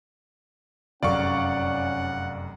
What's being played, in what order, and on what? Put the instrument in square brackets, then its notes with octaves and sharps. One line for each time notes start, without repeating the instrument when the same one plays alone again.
[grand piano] F1 F#2 [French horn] C#4 [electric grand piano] D5 F5 C#6 [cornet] F#5